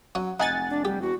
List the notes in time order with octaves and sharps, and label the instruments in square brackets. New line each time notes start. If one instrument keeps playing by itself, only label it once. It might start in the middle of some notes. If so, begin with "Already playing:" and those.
[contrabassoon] F#3 [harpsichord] C#4 F#5
[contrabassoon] F1 [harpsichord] D#4 [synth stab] F#5 G#5 A6
[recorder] D4
[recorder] G3 [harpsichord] G4
[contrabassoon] E2 [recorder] F#4